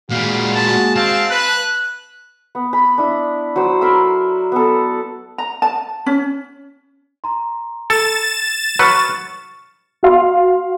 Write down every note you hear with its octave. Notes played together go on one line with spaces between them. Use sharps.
A#2 G3 G#3 F#4 F5
A5
C4 F5 A5
B4 F#6
B3
B5
D4 E4
F#3 C5
A#4 B5 C6 E6
B3 A4
A#5
A5
C#4
A#5 C6
A4 A6 E7
F#3 B4 C#6 F6 C#7
F#4 F5 C6